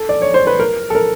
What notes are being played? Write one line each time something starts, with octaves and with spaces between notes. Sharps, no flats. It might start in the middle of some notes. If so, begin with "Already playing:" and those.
Already playing: A4
D5
C#5
C5
B4
A#4
A4
A#4